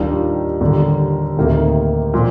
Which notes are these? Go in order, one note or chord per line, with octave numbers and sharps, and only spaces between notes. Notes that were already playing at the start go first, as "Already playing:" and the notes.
Already playing: D#2 D#3 G3 D4 F4
D#2 D3 G3
D2 C3 D#3 A#3
A#2 F3